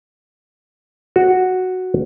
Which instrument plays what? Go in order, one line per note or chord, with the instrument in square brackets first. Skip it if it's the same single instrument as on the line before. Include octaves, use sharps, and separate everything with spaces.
[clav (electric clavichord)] F#4